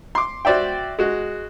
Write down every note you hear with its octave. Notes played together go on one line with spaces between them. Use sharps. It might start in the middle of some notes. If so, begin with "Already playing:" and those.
C6 D6
F#4 C5 D5 E5 G5
G#3 F#4